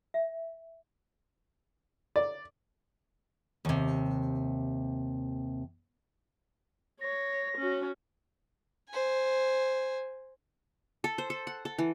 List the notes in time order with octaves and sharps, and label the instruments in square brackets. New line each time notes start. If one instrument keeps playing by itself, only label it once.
[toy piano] E5
[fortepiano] D5
[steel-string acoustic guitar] D#2 C3
[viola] C#5 [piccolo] A#6
[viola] C#4 F#4
[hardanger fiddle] C5 G#5
[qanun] A4
C5
A4
F#5
A4
E3